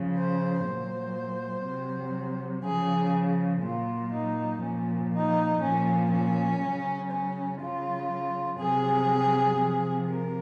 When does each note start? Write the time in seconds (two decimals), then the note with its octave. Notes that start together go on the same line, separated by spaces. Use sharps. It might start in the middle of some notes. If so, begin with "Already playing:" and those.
Already playing: C#3 F3
0.16 C5
0.65 A#2 F#3 C5
1.65 C3 F#3
2.63 C#3 F3 G#4
3.62 A#2 F#3 F4
4.12 D#4
4.61 A#2 F3 C#4
5.11 D#4
5.61 A#2 F3 C#4
6.11 C#4
6.60 C#3 F#3
7.10 C#4
7.60 C#3 F#3 F4
8.59 C3 F#3 G#4
9.58 C3 F3
10.08 A#4